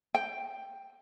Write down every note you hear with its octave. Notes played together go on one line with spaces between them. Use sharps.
G5